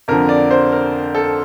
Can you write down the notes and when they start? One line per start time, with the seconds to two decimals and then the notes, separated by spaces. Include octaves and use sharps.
0.08 F2 D3 F3 A#4
0.29 D5
0.51 C5
0.72 A#4
1.15 A4